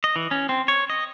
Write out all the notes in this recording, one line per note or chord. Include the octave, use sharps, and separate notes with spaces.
D#5
E3
C#4
C4
C#5
D#5